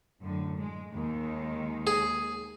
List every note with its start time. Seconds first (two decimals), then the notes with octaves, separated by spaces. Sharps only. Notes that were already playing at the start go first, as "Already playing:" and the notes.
0.22 F#2 A2 D3
0.56 G#3
0.93 D#2 D#3 G#3
1.87 G#4